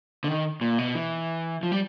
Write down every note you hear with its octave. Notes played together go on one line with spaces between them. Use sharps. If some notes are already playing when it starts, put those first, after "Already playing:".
D3
D#3
A#2
B2
E3
F3
G3